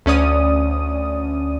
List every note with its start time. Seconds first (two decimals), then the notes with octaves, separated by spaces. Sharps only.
0.06 D2 C#4 D5 D#6 D#7